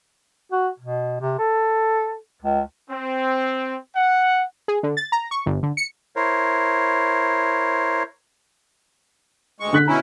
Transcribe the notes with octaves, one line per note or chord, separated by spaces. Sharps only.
F#4
B2
C3
A4
C#2
C4
F#5
G#4
D3
A6
A#5
C#6
G1
D3
C#7
E4 A#4 C5 C#5
D2 G#3 C#6
D3 F#6 B6
B2 C#4 E4 A#5